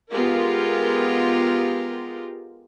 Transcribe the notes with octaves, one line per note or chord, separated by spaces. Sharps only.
G#3 B3 F4 G4 A#4